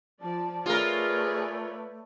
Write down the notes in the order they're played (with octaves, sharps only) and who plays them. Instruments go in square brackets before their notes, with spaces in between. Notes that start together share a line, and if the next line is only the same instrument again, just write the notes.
[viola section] F3 D5 [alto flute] A5
[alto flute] A3 [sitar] F4 A#4 [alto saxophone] G#4 [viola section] B4 C#5 D5